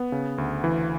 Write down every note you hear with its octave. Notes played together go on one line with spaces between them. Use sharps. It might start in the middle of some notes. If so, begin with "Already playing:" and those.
Already playing: B3
C#3
D2
E3